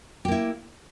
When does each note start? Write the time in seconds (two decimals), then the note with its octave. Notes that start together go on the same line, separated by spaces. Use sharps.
0.25 G4
0.28 A#3
0.32 E4